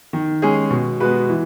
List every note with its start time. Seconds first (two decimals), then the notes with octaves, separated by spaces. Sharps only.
0.13 D#3
0.42 G#3 C#4 G#4
0.70 B2
1.00 G#3 B3 F#4 B4
1.29 E3